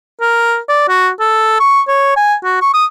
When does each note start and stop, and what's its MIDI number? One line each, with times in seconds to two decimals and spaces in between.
0.21 0.58 70
0.69 0.86 74
0.89 1.10 66
1.20 1.56 69
1.60 1.81 85
1.88 2.15 73
2.16 2.35 80
2.44 2.60 66
2.62 2.69 85
2.74 2.86 87